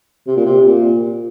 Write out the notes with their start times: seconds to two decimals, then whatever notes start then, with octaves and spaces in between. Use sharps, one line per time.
0.27 C3
0.36 A#2
0.45 C3
0.66 A#2